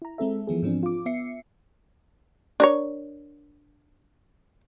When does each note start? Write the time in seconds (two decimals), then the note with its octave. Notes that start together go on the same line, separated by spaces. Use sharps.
0.02 E4 A#5
0.18 G#3 C4 A4 E5
0.47 E3 F3 B3 G#4
0.62 G#2 F3 C4 D4
0.83 F4 D6
1.06 B3 E5 C7 C#7
2.60 D4 A#4 C#5